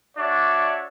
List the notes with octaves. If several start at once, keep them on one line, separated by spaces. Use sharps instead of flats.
D4 F#4 C#5 D5 E5